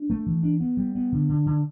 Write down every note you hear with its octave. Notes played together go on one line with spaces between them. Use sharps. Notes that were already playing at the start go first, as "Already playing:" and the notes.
Already playing: D4
A3
E3
D4
B3
G3
B3
D3
D3
D3